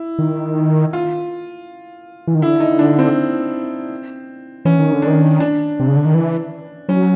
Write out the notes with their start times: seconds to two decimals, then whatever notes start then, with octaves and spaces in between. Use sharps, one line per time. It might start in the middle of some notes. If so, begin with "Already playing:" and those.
Already playing: E4
0.19 D#3
0.93 F4
2.27 E3
2.35 D#3
2.42 D3 E4
2.60 D#4
2.79 D4
2.99 C4
4.65 E3 C#4
4.79 D#3
4.93 D3
5.02 D#3 D4
5.40 D4
5.80 C3
5.88 C#3
5.97 D3
6.05 D#3
6.14 E3
6.89 F#3 C#4